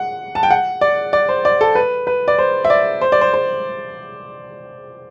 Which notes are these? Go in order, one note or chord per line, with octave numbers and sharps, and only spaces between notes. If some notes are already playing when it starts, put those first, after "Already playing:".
Already playing: F#5
A5
G5
F#5
D5
D5
C5
D5
A4
B4
B4
D5
C5
E5
D5
C5
D5
C5
C5